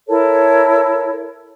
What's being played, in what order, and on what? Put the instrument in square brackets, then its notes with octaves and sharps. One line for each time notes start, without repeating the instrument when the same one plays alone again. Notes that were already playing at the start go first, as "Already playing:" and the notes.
[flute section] E4 A4 A#4 C#5